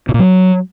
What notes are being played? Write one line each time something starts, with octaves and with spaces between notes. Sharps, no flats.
B2
A#2
F#3